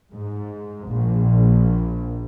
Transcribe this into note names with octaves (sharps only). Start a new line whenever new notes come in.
G#2
A#1